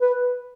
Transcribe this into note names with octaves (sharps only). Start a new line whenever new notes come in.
B4